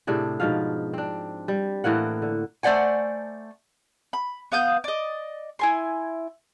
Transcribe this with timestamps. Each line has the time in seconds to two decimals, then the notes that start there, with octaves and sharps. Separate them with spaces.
0.07 A2 C3 D4 G#4
0.40 G#2 B2 F3 F5
0.93 C4 D4
1.48 G3
1.84 A2 E3 A#3 F#5
2.22 D3
2.63 A3 C5 D5 F#5 G#5
4.13 B5
4.52 B3 F5 D#6 G6
4.84 D5 D#5
5.59 E4 G#5 C6